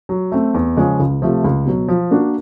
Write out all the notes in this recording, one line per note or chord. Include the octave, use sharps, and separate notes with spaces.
F#3
A3 C4
E2
C#3 F3 G#3 C#4
C#2
C3 F3 A3
C#2
B2 F#3
F3
A#3 D4 F#4 A#4